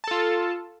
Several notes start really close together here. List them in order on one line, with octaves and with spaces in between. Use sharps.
A5 A4 F4